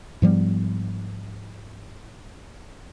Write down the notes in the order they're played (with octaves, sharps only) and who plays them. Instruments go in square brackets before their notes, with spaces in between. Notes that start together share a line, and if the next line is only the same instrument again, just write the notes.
[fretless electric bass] G#2 F3 G3 B3